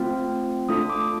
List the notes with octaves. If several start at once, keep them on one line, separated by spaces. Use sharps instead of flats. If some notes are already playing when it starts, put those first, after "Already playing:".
Already playing: A3 C4 F4
A3 D4 F4 A4 D#6
D6